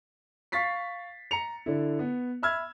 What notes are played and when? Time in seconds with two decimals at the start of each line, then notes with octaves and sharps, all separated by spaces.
0.52 F5 C#6 A6 B6 C7
1.31 A#5 C#7 F7
1.66 D3 E4
1.99 B3
2.43 E5 B5 E6 F6 G#6